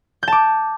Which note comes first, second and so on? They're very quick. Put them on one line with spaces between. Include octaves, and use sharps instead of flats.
G6 A5 D6